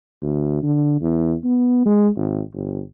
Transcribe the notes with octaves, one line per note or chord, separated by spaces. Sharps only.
D2
D3
E2
B3
G#3
G#1
G1